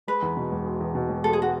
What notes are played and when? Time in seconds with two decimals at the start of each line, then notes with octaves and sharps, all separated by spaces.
0.07 G#3 B4
0.22 E2
0.37 B2
0.52 E1
0.65 G#3
0.81 E2
0.95 B2
1.09 E1
1.24 G#3 A4
1.33 G#4
1.42 F#4